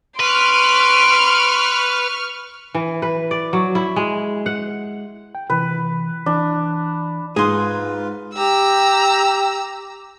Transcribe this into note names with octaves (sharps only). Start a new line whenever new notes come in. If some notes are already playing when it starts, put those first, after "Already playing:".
B4 C6 C#6 F6 D7
E3
B4
D5
F#3
E4
G#3
F#5
G5
C3 E3 B4
E3 D4
G#2 D#4 F4 G#4 B4 C6 D#6
G4 A#5 E6